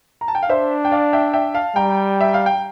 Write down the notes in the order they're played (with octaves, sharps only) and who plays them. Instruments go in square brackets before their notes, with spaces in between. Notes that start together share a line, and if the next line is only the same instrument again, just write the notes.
[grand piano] A#5
A5
G5
F5
[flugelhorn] D4 [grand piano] C5 E5
[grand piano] G5
D5 F5
E5 G5
E5 G5
F5 A5
[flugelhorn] G3 [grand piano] G5 A#5
[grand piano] E5
F5
G5